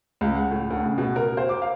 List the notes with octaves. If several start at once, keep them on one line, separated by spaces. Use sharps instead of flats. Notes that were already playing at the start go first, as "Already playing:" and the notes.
C#2
F#5
A2
D2
C#3
B2
A#4
C5
D6
F5